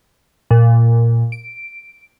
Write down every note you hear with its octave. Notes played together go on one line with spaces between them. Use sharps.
A#2
D7